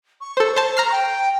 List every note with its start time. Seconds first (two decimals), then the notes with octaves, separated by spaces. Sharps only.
0.21 C#6
0.37 A4 C5
0.56 C5 A5
0.77 A#5 F6 C7
0.92 G5